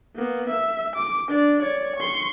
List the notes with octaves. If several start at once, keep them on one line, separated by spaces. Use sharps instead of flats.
A#3 B3
E5
D6
D4 D5
C#5 D5
C6 C#6